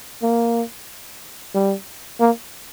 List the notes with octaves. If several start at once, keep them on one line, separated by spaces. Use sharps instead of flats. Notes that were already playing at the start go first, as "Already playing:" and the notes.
A#3
G3
A#3